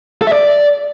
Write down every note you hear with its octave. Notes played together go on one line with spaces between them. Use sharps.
A4
E5
D5